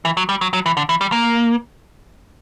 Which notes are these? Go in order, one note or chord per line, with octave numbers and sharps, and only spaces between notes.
E3
F#3
G3
F#3
F#3
E3
D3
E3
G3
A#3